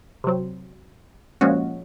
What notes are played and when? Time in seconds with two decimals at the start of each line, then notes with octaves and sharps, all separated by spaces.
0.24 C3 F#3 C4
1.41 A#2 F3 G#3 C#4 F#4